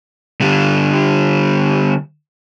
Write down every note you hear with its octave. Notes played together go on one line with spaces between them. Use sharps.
D3 G3